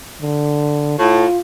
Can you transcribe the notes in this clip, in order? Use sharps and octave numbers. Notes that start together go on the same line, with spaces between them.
D3
A2 F4